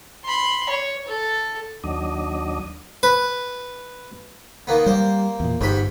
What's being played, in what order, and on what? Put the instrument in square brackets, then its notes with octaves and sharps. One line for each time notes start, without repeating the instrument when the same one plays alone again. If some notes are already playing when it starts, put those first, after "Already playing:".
[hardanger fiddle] B5 C6
C#5
A4
[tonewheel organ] D#2 F#3 D4 D#5
[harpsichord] B4
D#3 A#3 B3
[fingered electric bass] G3 [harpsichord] A#3 C5
[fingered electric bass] E2 A#2
[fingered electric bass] G1 [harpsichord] G#2 G4 B5